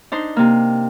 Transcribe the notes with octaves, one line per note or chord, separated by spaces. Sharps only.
D4 D#4 C5 C6
C3 A#3